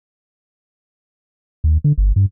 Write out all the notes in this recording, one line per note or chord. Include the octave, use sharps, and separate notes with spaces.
D#2
D3
G1
G2